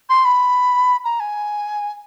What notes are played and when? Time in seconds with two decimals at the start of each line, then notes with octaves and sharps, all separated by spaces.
0.10 C6
0.25 B5
1.05 A#5
1.20 G#5